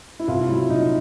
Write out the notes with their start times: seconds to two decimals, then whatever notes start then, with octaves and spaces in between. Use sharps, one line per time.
0.20 E4
0.28 C2 F4
0.49 F#3 E4
0.69 A#2 D#4